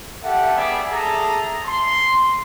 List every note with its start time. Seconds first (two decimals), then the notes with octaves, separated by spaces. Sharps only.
0.23 G4 A4 E5 F#5
0.56 G3 B3 G#4 D5 E5
0.92 G#4 A4 E5 A#5
1.66 C6